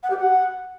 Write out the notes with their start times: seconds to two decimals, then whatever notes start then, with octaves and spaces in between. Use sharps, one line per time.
0.03 F#5
0.10 G4
0.17 F#5